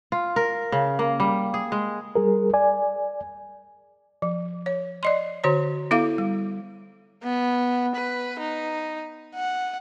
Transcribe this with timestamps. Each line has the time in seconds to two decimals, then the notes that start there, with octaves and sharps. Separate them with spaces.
0.12 F4
0.36 A#4
0.72 C#3
0.99 A#3
1.20 G3
1.54 G#4
1.72 G#3
2.16 G3 G#4 A#4
2.54 D5 G#5
4.22 F3
4.66 C#5
5.03 D5 D#5 C6
5.44 D3 F#4 C#5 A#5
5.91 B3 E4 A4 E5 F5 D6
6.18 G3
7.23 B3
7.95 B4
8.39 D#4
9.35 F#5